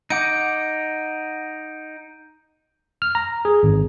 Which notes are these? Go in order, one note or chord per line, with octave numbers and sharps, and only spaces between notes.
D#4 F#5 D6 G6 D7
F6
A#5
G#4
G#1